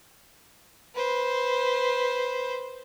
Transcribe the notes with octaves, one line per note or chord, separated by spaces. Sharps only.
B4 C5